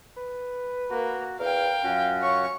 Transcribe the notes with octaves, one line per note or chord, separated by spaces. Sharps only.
B4
A#3 F#4
E2 A#4 F5 G5
F#2 C#4 F4 F#4
C#5 C#6